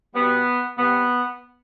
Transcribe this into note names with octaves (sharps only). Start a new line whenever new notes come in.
B2 G3 B3
C3 G3 B3